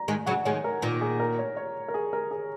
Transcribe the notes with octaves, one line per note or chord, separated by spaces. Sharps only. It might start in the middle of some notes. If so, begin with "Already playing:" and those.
Already playing: A#5
D#3 G#3 G#5
C#3 F#3 F#5
D#3 G#3 C#5
A#4
A#2 D#3
G#4
A#4
C#5
C#5
A#4
G#4
A#4
G#4